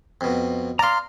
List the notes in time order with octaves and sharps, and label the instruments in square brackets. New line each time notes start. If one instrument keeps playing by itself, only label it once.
[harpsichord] F2 B2
[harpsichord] D5 F5 [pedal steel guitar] A#5 C6